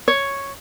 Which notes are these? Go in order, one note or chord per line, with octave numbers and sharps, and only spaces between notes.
C#5